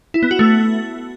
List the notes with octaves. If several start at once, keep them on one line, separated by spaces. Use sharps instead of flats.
E4
B3
F#4
A3